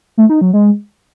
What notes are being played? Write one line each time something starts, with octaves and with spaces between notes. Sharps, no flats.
A3
D#4
F#3
G#3